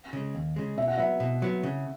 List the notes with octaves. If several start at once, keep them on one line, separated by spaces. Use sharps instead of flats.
C#3 G#3
D#2
C#3 G#3
B2 E5
F#5
F#3 B3 E5
B2
F#3 B3
C#3